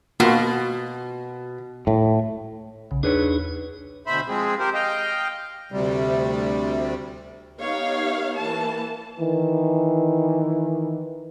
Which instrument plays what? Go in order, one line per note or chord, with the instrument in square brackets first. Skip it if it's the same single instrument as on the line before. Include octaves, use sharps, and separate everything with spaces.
[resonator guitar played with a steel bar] B2 [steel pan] A#3 F4 F#4
[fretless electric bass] A2
[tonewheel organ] B1 [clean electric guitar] C#3
[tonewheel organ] E2 D#4 G#4 [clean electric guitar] D4 B4 C#5
[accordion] D2 B2 C5 E5 B5
F3 G#3 C4 G#4
G4 A#4 C5
D#5 F5 G5
D2 C3 G3
[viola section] B3 D#4 G4 C#5 F5
E3 A#3 A5
[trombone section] D#3 E3